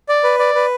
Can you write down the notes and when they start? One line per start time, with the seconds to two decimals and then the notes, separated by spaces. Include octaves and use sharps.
0.09 D5
0.24 B4
0.39 D5
0.55 B4